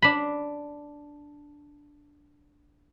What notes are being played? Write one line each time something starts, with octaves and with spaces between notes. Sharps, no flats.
D4 B5